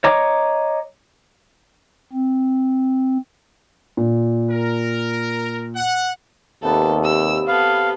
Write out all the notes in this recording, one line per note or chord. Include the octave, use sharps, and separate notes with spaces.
C#5 D#5 A#5 D6
C4
A#2
A#4
F#5
D#2 C3 B3 A4 E5
D5 E6
B3 A4 F5